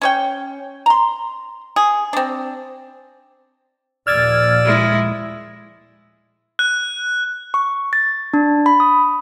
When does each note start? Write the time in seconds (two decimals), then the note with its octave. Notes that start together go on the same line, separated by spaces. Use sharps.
0.02 C#4 C#5 G5
0.86 A#5 C6
1.76 G#4
2.13 C4 D4
4.07 D#2 A#2 F3 D5 E6 F6 G#6 A6
4.65 G#3 E4
6.59 F#6
7.54 C#6
7.93 A6
8.34 D4
8.66 B5
8.80 D#6